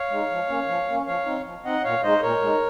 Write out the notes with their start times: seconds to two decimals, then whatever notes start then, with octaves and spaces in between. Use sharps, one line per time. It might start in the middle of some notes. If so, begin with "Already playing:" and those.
Already playing: C#5 F5
0.11 G#3 D#4
0.30 F3
0.49 A#3 C#4
0.68 F3
0.88 A#3 C#4
1.06 F3 C#5 F5
1.26 C4 D#4
1.45 F3
1.64 C4 D#4 D#5 F#5
1.84 A#2 C#5 F5
2.03 G#3 D#4 C5 D#5
2.22 A#2 A#4 C#5
2.41 G#3 D#4